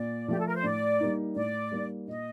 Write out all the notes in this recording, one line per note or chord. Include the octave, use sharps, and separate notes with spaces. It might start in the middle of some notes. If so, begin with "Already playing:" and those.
Already playing: A#2 D5
F3 A3 G4
A4
A#4
C5
A2 D5
G3 A#3 D#4
A2 D5
G3 A#3 D#4
A#2 D#5